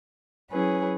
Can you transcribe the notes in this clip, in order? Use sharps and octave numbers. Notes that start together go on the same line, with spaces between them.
F#3 C#4 E4 G#4 B4